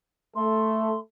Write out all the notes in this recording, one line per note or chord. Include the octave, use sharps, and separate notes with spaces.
A3 A4 C6